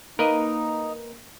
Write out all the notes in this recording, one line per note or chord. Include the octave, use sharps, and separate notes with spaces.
A#3 D#4 A#4 B4 D#5